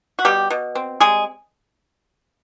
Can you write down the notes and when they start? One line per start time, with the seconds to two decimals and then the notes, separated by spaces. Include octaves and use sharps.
0.19 F#4
0.25 B2 G3 G4
0.50 B2
0.75 C4
1.00 G3 G#3 G#4